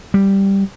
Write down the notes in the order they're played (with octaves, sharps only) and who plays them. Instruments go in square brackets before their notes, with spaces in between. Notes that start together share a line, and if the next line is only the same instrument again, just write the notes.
[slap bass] G3